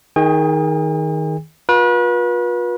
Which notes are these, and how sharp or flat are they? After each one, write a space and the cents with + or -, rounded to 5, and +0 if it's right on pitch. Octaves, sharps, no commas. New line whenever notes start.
D#3 +10 G#4 +0 G#5 -45
F4 +40 B4 -35